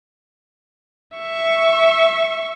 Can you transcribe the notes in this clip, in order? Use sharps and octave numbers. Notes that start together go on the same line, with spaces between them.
E5 C#6